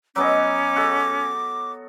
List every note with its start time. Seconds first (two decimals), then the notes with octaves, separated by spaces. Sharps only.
0.16 F#3 B3 C#4 D#5 D6
0.76 F#4 A4